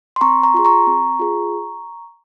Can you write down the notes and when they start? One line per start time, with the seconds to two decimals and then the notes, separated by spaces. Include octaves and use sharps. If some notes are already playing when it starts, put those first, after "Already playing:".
0.16 C6
0.21 C4 A#5 C#6
0.43 A#5 C#6
0.54 F4 G#4 C6
0.65 A#5 C#6
0.87 C4
1.19 F4 G#4